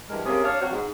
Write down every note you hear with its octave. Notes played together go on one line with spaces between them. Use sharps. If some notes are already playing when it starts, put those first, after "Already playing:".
G2 E3 G#3 A#4
C3 A#3 C#4 G#4
D4 C#5 F5
F#3 C4 F#4
G#2